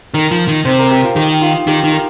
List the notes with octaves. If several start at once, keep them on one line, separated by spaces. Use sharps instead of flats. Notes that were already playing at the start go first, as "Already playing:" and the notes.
D#3 A#4
F3
D#3
C3 C5
A#4
G4
F4
D#3 G4
F4
D#3 G4
D#3
A#4